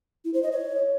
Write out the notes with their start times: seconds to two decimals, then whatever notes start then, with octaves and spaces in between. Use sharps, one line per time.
0.25 E4
0.34 C5
0.43 D#5
0.52 C#5